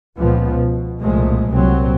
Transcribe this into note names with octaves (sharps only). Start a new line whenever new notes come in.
C#2 A#2 F3 B3
B2
C2 A#2 F3 G#3 A3
C2 A#2 F#3 C4